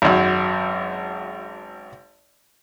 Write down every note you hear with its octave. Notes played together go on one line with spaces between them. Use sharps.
G#1 F#2